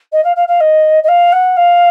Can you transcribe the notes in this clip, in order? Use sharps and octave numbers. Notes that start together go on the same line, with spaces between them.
D#5
F5
F5
F5
D#5
D#5
F5
F#5
F5